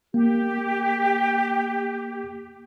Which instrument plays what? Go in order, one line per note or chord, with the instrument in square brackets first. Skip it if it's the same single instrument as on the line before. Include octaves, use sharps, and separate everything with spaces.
[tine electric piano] A#3 [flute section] G4